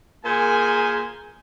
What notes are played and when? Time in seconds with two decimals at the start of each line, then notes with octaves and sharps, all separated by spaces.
0.25 A#2 G#4 A#4 C5 G#5